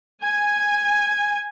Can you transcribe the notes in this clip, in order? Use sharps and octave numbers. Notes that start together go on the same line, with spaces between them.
G#5